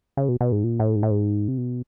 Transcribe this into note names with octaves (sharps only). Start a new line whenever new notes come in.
C#3
B2
B2
G#2
A#2
A2
G#2
A2
G#2
C3
B2